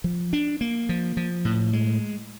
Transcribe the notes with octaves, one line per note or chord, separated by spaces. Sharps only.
F3
D4
A#3
F3
F3
A2
G#3